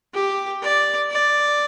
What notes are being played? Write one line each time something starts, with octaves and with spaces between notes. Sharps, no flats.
G4
D5
D5